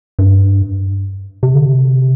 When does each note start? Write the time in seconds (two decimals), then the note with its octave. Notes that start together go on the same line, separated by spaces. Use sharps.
0.19 G2
1.43 C3
1.55 D3
1.66 C3